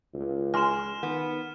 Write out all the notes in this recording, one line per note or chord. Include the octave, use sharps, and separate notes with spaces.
C#2
G#3 G#5 C6 F6 E7
D#3 B3